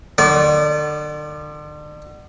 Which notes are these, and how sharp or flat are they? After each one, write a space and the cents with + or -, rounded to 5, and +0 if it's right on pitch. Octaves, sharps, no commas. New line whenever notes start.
D3 +35 D5 -30